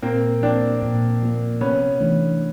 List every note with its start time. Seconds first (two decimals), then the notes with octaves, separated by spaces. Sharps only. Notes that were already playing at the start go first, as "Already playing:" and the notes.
0.02 A#2 A#3 C4
0.42 F3 A#3 C4 D4
0.82 A#2
1.22 F3 A#3
1.61 C3 B3 C#4
2.00 E3 A3 D4